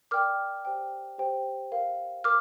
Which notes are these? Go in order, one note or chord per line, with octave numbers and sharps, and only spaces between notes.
A#4 D5 G5 D6 F6
G4 C5 G5
G4 C5 G5
A#4 F5
A#4 D6 F6